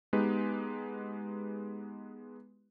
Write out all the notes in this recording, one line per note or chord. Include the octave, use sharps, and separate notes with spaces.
G#3 B3 D#4 G4 B4